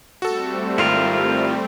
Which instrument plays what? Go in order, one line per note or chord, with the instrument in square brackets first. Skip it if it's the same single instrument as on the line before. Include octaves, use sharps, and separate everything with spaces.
[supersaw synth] G3 A3 C4 [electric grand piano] F#4 A4
[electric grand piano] G#1 [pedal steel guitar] E4 F4 A#4